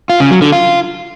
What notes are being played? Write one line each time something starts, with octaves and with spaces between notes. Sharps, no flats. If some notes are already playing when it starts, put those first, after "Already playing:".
F4
C#3
F#3
D3
F4